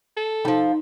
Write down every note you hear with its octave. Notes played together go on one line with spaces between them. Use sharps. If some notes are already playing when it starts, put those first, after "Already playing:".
A4
F3 G3 D#4